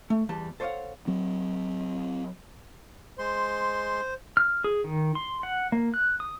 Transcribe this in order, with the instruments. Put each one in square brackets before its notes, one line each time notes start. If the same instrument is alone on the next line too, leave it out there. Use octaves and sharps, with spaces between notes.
[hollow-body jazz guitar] A3
E2 G3 A5
A4 C5 C#5 D#5 F5 F#5
[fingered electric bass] F#3 C4
[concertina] G#3 C6 [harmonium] C5
[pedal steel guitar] F6
G#4
D#3
C6
F#5
A#3
F#6
D#6